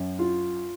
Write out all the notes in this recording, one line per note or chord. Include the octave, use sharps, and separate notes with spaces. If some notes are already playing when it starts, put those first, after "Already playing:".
Already playing: F#2
F4